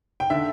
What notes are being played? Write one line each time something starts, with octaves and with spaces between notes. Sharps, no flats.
G5
D3 E5